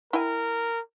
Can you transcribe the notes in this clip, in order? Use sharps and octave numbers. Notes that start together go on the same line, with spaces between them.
E4 A#4 G5 G#5